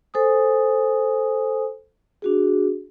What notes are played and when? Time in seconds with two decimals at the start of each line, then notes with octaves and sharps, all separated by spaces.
0.14 A4 C5 G#5 D#6
2.22 D4 F#4 G#4